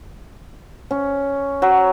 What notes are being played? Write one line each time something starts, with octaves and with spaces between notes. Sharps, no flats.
C#4
F#3